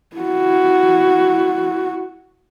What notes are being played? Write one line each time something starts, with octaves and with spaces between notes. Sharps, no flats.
E4 F#4